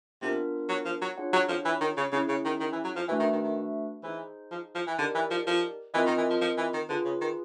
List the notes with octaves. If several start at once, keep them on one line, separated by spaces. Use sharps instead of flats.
C3 B3 D4 F4 A#4
F#3
F3
F#3
D4 F4 G#4 C#5 F#5
F#3
F3
E3
D#3
C#3
C#3 C#4 E4 G#4
C#3
D#3
D#3
E3
F#3
F3
E3 A3 D4 F#4 B4 E5
D#3
D#3
D#3
E3 D#4 G#4 C5
F3
F3
E3
D3 D#4 G4 A#4 D5
E3
F3
F3
E3 C4 F4 A#4 D#5
D#3
E3
F3
F3
E3
D#3
D3 F4 G#4 B4
C#3
D#3